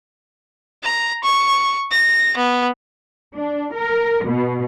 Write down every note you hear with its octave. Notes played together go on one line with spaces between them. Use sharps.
A#5
C#6
A#6
B3
D4
A#4
B2